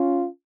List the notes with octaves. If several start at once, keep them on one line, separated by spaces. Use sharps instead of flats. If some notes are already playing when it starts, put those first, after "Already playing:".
Already playing: C#4 F4